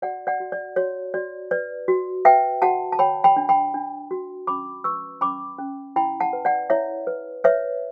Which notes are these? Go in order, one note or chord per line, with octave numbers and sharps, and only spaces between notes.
F#4 D5 F#5
D5 F#5
F#4
D5
F#4 C#5
F#4 D5
B4 D5
F#4
B4 E5 G5
F#4 F#5 A5
A5
C#5 G5 B5
G5 B5
D4
G5 B5
D4
F#4
C#4 B5 D6
B4 C#6 E6
C#4 B5 D6
C#4
E4 G5 B5
F#5 A5
B4
D5 F#5
E4 C#5 E5
B4
B4 C#5 E5